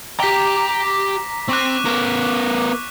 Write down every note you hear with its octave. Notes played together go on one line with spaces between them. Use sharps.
G4 G5 A#5 D6 A#6 B6
C4 C#6 D6 F#6
B3 A#4